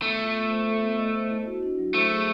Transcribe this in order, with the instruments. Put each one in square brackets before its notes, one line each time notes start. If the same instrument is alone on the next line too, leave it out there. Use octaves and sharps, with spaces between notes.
[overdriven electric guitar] A3 [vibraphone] B3
[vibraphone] F4
B3
C5
A4
B3
D#5
C5
E4
F#4
D4
F#3
[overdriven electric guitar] A3 [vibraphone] C5
[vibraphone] G#4